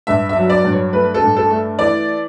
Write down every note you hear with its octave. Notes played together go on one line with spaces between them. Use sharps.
G2 E5
E5
F#3
D5
G2
C#5
A3 B4
A4
G2
A4
A3
E3 D5